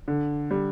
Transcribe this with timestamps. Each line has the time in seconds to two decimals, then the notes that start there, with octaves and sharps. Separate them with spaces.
0.08 D3
0.51 G3